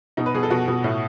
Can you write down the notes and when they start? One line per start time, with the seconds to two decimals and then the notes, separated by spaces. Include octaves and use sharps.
0.17 B2 D#4
0.26 B4
0.35 B2 G#4
0.43 A4
0.50 B2 F#4
0.68 B2
0.84 A2